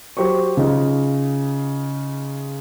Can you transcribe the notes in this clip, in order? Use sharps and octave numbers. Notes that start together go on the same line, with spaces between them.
F#3 G4 C5 C#6
C#3 D#4 F4